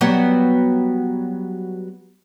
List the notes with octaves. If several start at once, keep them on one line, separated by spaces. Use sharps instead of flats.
F#3 G3 B3